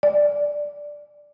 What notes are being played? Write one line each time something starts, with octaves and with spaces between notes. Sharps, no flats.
D5